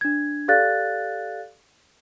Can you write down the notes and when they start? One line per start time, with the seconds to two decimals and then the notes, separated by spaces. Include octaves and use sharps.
0.01 D4 G#6
0.48 G4 A4 D5 F5 F#6 A6